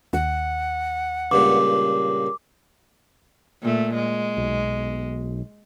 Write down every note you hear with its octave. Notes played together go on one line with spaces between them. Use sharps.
D#2 F#5
C#2 G2 A#2 D6
A#2 A3
G#3
B1